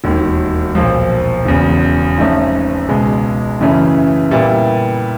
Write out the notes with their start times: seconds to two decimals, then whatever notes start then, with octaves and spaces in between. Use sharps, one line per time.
0.04 E1 D#2 D#3
0.75 B1 A#2 F3
1.45 E1 E2 C#3
2.18 G#1 G#2 F3 A3 C#4
2.89 C#2 B2 G#3
3.61 F#2 C#3 E3 A3 C#4
4.31 A#2 G3 B3 E4